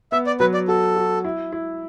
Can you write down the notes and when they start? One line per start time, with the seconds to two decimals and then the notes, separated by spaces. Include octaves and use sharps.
0.12 B3 E5
0.27 D5
0.40 F#3 B4
0.54 D5
0.68 F#4 A4
0.96 F#4
1.24 E4
1.52 E4